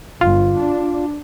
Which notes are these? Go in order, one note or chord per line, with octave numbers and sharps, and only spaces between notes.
G1 F4
D4